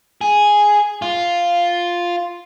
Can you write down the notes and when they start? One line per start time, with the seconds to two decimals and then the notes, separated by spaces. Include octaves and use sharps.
0.21 G#4
1.02 F4